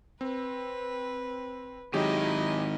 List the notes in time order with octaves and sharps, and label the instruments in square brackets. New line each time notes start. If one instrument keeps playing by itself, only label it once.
[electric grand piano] C4 [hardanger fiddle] B4
[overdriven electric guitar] G#2 D#3 [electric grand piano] F#3 G4 G#4 [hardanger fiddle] E4 D#5